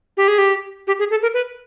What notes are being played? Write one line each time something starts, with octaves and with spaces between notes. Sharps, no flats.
G4
G#4
G4
G4
G#4
A4
A#4
B4